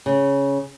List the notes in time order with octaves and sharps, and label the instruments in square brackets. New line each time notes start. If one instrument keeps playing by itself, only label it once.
[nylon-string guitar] C#3